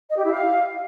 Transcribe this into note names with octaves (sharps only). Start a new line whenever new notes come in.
D#5
G4
E4
F5